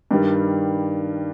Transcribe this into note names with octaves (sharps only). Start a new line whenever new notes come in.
G2 D#3 G3